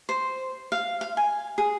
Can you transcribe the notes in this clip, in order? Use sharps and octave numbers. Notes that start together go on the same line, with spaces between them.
C5
F5
F5
G#5
G#4